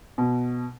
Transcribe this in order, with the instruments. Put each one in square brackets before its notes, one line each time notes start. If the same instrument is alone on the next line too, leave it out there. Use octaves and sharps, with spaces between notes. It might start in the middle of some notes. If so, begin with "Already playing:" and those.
[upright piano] B2